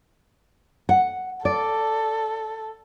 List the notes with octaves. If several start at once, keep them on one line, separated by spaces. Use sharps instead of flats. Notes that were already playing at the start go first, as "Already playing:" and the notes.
F#5
A4 D5